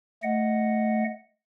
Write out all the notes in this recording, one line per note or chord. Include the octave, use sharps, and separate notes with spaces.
A3 D#5 F#5